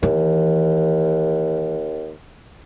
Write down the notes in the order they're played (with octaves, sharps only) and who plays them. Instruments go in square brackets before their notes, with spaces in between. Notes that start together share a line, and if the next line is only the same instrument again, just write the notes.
[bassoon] D#2 [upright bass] D#3 E3